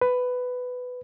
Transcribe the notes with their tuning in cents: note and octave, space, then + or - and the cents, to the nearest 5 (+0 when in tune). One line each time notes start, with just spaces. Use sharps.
B4 +10